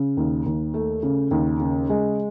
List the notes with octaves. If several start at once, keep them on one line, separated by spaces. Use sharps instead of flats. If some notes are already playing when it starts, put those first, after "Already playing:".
Already playing: C#3
D#2
D#2
A3
C#3
D#2
C#3
G#3